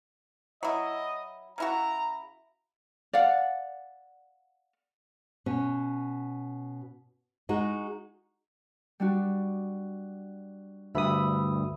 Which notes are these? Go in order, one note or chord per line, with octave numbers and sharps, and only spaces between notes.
F#3 E4 D#5
C#3 E4 F#4 A#5
D5 F5 F#5
B2 C#4
G#3 D#4 F#4
G3 D4 F#4
D2 G2 E5 B5 D#6